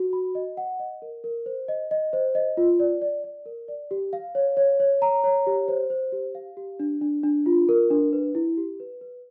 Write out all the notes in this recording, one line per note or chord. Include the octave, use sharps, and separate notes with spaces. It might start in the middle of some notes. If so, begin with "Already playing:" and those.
Already playing: F#4
B5
D#5
F#5
D#5
A#4
A#4
C5
D#5
D#5
C5
D#5
F4
D5
D5
D5
A#4
D5
G4
F5
C#5
C#5
C#5
A#5
C#5
G4
C5
C5
G4
F5
G4
D4
D4
D4
F4
A#4
D4
B4
E4
G4
B4
B4